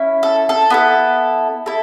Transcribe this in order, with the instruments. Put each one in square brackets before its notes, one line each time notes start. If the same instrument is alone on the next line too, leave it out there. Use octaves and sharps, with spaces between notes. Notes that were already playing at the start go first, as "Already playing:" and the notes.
Already playing: [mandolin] C#4 E4
A4
A4
B3 E4 A4
E4 A4